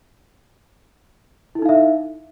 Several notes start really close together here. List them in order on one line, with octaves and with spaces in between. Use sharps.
E4 A4 D#4 F5 E5